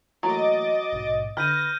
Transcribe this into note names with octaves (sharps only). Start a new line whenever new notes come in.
E3 F#3 A3 A#3 D#5 D6 A6
A#1 G#2 B2
D3 B4 F6 G6 A#6 D#7